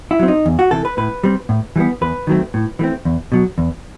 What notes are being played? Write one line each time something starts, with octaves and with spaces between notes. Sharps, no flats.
E4
F#3 C4
D#4
E2
F#4
C3 E3 A4
B4
A2 B4
G3 C4
A2
E3 G3 B3
E2 B4
D#3 F#3 A3 C4
A2
E3 A3 C4
E2
B2 F#3
E2